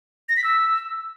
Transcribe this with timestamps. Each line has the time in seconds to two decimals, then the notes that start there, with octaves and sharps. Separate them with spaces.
0.29 A#6
0.36 B6
0.44 E6